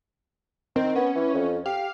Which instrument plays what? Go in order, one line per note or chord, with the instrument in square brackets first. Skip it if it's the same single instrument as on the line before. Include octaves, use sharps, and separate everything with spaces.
[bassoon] D#3 [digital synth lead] C4
[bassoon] B3 [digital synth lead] C#4
[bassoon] E3
F2
[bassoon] G4 [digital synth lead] F5